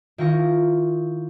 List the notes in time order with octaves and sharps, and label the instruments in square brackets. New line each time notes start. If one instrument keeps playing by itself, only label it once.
[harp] D#3 E4 F4 G5 C#6 A#6